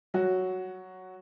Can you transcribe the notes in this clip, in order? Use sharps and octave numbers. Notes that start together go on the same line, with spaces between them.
F#3 F#4